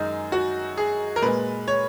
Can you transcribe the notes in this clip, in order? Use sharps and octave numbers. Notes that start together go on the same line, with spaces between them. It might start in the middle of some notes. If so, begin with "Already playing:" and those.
Already playing: F#2 D#3 G#3 D#4
F#4
G#4
A#4
A#2 G#3 B4
C#5